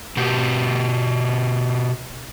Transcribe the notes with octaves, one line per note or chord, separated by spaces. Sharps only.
B2 F#4 G4